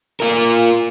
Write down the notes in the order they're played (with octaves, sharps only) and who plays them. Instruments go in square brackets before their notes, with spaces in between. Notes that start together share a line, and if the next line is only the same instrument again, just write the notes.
[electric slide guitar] A#3 F4 A#4